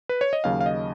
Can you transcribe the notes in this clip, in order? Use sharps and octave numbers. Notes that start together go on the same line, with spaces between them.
B4
C#5
D#5
D#2 C#3 F#3 F5
F5
D#5